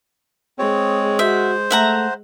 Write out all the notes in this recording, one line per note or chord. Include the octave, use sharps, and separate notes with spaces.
G#3 C4 G#4 C#5
F#4 C5 E5
A3 E5 F#5 A#5